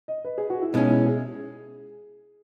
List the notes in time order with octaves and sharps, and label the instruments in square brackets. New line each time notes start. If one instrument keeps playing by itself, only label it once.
[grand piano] D#5
B4
G#4
F#4
E4
[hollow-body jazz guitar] B2 G#3 C#4 [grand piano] D#4
[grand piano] E4
G#4